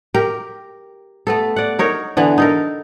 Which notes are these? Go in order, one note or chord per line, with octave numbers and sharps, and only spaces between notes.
G4 A#4
A3 B3 A4
D5 F#5
D#4 A#4 C#5
D3 E3 B3
D#4 A4 A#4